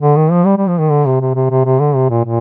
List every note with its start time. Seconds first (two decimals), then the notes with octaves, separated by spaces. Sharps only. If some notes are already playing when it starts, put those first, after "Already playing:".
0.01 D3
0.17 D#3
0.31 F3
0.46 G3
0.57 G3
0.68 F3
0.80 D#3
0.91 D3
1.06 C3
1.21 C3
1.35 C3
1.50 C3
1.65 C3
1.80 D3
1.95 C3
2.10 A#2
2.25 A#2